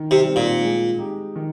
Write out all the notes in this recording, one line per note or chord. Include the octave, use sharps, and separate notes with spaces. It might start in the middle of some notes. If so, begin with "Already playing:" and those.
Already playing: D#3
C3
G3 C4
A#2
G#3
D#4 G4
D#3